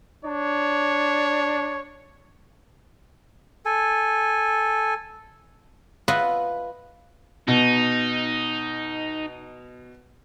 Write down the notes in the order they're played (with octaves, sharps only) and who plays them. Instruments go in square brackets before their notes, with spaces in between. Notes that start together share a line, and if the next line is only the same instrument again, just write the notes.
[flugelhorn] D4 [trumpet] C#5
[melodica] A4 G#5
[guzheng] F4 B4 D#5 E5 F#5
[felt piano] B2 [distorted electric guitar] D#4